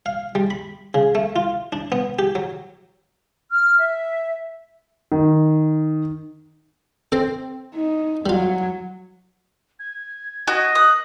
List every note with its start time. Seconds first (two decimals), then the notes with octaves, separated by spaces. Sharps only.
0.06 F5
0.35 G3
0.50 B5
0.94 C#3
1.15 A3
1.36 F4
1.73 D4
1.92 B3
2.19 G4
2.35 F#3
3.51 F6
3.78 E5
5.12 D#3
7.12 C4 A4 C5
7.75 D#4
8.26 F#3 G3 F4
9.79 G#6
10.47 F#4 D#5
10.75 D#6 F#6